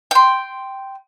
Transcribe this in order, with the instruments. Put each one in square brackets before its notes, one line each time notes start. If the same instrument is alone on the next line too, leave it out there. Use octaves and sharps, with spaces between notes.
[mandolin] G5 C6